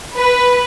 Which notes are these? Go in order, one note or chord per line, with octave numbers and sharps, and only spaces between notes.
B4